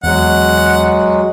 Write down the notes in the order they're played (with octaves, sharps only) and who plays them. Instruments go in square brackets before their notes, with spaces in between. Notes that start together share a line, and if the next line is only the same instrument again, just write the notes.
[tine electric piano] E2 [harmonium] F#3 G#3 [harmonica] F#5